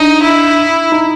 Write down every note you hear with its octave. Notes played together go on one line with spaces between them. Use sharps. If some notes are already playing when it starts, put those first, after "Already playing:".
Already playing: D4 D#4
E4
D#4